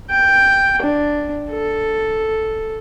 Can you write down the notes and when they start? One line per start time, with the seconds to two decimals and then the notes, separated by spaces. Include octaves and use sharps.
0.10 G5
0.82 D4
1.51 A4